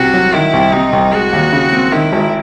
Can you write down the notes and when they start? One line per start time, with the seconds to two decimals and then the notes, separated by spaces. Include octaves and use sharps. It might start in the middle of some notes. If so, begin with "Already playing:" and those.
Already playing: C2 C3 F#4
0.14 F#3
0.33 D#3 E4
0.53 C2
0.73 C3 D#4
0.93 C2
1.13 G#3 F#4
1.33 D#2
1.52 C#3
1.72 C4
1.92 D#3 E4
2.13 G#1